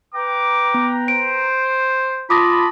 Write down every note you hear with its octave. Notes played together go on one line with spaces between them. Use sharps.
B4 G5 A#5 D6
B3
C5 D7
F4 A5 B5 D6 D#6 A#6